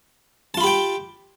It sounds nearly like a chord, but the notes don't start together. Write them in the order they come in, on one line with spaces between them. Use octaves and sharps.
A5 F4 B5 G4 G5